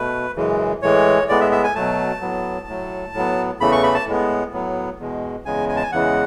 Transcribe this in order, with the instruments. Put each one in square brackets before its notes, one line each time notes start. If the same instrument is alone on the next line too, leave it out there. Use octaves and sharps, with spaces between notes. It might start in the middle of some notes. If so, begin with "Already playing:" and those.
Already playing: [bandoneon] B2 A3 B4
F#2 C#3 E3 G#3
A2 E3 G#3 C#5
A2 G#3 B3 D5
E5
E5
G#5
B2 F#3 A3 A5
A2 F#3 B3
A2 F#3 A3
A2 F#3 B3
E2 C#3 E3 A3 B5
C#6
B5
A5
A2 G#3 B3
A2 F#3 B3
E2 B2 G#3
E2 C#3 G#3 G#5
G#5
A5
G#5
E2 C#3 E3 G#3 F#5